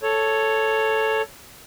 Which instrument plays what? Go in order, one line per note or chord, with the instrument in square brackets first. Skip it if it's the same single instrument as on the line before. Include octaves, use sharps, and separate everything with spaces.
[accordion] A4 C#5